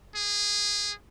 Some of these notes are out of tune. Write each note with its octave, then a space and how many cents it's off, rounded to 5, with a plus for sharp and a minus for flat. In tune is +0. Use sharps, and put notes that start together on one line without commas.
G#4 -15